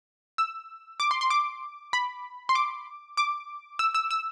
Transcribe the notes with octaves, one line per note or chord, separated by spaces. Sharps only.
E6
D6
C6
C6
D6
B5
C6
D6
D6
E6
E6
E6